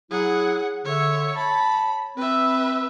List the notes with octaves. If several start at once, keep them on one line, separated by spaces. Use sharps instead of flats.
F#3 E4 G#4 F#5
D3 C#5 E5
C#5 A5 B5
C4 B4 E5